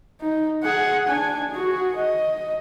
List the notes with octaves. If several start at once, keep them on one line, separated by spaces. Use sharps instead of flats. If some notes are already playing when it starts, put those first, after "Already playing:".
D#4
G#4 F#5
D4 G#5
F#4 G#4
D#5